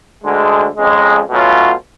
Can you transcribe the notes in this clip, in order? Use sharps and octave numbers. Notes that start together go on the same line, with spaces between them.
D2 D3 G#3
F2 C#3 G#3
B2 F#3 A3 C#4 F4